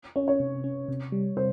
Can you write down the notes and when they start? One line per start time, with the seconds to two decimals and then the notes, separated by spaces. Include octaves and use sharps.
0.16 C#4 C#5
0.28 C#5
0.40 C3
0.64 C#4
0.88 C3
1.12 G3
1.37 C3 C5